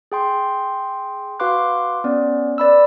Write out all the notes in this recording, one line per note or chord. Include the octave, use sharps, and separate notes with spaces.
G#4 G5 C6
F#4 B4 F5 C6 D6 F#6
B3 C#4 D5
B4 D5 B5 E6